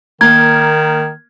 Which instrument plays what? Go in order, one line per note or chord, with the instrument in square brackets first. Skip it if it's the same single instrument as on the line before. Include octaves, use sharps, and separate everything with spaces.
[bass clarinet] D#3 [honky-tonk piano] A#3 [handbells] G#6